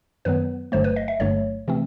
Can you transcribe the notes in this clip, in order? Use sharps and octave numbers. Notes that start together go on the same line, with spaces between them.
F#2 D#3 F#3 B3 B4
G1 G2 D3 F#3 A3 C5
B4
D#5
E5
G1 G2 D3 F#3 A3 C#5
C3 E3 A3 C4